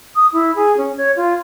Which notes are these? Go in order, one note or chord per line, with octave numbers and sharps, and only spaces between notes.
D#6
E4
G#4
C#4
C#5
F4